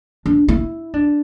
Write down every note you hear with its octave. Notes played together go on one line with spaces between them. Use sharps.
D4
E4
D4